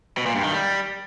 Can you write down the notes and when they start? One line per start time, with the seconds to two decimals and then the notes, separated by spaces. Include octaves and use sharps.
0.18 B2
0.26 A#2
0.35 G2
0.43 D#3
0.52 G3